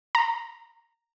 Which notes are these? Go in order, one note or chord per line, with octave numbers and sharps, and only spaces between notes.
A#5